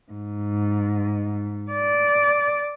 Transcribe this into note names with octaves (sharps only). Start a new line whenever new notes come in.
G#2
D5